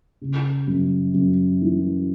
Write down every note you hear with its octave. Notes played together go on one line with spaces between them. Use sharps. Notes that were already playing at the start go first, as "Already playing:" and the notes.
C#3
F#2
F#2
E3